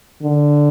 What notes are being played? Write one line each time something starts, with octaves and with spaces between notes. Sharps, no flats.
D3